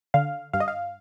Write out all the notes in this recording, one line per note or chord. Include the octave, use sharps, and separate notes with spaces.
D3 F5
G2 F5
D#5
F5